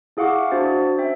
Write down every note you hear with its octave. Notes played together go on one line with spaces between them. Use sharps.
E4 G#4 F5 F#5 C#6 D6
E5
D4 F#4 C5 A6
C#4 C5 E5 G5